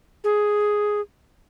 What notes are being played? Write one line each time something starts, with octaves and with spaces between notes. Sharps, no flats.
G#4